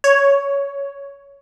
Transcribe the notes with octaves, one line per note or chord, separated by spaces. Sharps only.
C#5